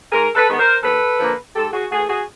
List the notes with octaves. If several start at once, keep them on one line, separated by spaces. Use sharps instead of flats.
G#2 G#4 A#4
A4 B4
D#3 G#3 B3
A#4 C5
D#2 A4 B4
D3 F3 A#3
G#2 G4 A4
F#4 G#4
E3 A3 F#4 G#4
F#4 G#4